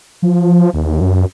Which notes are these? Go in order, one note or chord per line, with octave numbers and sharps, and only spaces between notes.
F3
D#2
F#2